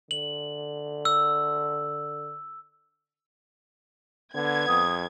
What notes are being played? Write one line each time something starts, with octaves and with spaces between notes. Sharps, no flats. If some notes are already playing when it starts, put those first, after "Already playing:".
D3 F#7
E6
D3 B3 G#6
F2 D#6